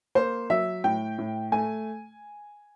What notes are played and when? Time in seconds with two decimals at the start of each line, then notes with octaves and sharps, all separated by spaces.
0.15 A#3 C5
0.50 F#3 E5
0.84 A2 G5
1.18 A2
1.52 A3 G#5